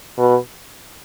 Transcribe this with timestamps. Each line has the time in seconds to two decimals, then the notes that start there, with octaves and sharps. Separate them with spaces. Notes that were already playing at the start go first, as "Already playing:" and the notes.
0.18 B2